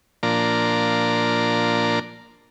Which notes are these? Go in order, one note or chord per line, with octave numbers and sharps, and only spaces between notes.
A#2 F3 A#3 D4 D5 A#5